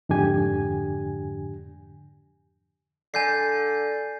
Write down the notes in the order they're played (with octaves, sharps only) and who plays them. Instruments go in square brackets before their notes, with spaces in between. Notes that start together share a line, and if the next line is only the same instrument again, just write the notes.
[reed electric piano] F2 G#2 D3 D4 G4 G#5
[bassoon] D3 [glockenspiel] G#5 G6 C7